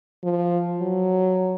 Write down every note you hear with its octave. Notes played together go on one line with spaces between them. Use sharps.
F3
F#3